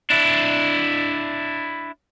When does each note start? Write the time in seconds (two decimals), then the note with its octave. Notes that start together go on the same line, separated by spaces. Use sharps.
0.10 D4 E4